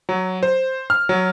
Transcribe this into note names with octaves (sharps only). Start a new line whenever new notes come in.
F#3
C5
F6
F#3